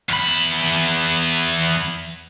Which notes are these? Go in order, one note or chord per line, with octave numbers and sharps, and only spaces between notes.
E2 B5